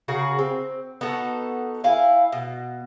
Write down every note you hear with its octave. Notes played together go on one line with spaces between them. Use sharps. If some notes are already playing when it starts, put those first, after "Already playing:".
C#3 F#4 G#4 A#4
C4
B3 D#4 F#4 A4
E4 F5 G#5
B2